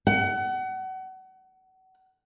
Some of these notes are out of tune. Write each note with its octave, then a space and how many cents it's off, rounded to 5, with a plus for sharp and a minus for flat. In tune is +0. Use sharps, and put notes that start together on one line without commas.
F#5 +30